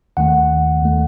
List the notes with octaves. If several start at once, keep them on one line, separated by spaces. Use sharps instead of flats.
D#2 D#3 A3 F#5
D#2 D#3 A3